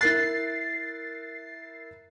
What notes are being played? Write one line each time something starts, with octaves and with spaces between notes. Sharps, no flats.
E4 A#4 F#6 A6 C7